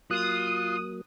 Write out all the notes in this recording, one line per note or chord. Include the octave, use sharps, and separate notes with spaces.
F#3 A#3 F4 D#6 F#6